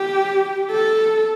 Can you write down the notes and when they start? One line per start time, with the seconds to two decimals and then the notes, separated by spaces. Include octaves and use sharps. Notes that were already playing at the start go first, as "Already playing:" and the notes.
Already playing: G4
0.71 A4